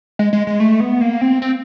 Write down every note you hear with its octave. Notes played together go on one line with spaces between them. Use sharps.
G#3
G#3
G#3
A3
B3
A#3
C4
C4